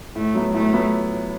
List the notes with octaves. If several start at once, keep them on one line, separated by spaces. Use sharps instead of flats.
A2 A3
F#3 B3 E4
A2 A3
F#3 B3 E4